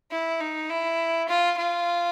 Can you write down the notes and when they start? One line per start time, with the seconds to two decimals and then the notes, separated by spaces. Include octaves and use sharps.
0.12 E4
0.40 D#4
0.70 E4
1.29 F4
1.58 F4